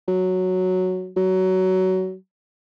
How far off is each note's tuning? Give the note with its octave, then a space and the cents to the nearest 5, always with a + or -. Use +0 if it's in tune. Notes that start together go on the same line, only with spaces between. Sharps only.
F#3 +0
F#3 +20